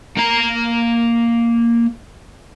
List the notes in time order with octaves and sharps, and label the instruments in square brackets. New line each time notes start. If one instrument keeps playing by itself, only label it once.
[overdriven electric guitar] A#3 A#5